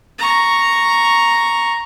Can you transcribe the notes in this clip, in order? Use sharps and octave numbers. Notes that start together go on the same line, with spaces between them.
A#5 C#6